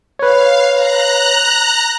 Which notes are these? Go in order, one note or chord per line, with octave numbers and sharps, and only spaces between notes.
B4 C#5 F5
A#5 F#6